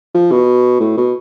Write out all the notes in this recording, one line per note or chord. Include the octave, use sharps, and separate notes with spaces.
F3
B2
A2
B2